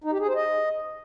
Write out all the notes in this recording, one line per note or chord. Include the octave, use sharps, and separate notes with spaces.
D#4
G4
G#4
C5
D#5